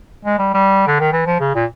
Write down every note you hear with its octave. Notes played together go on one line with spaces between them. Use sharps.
G#3
G3
G3
D3
D#3
E3
F3
C#3
A#2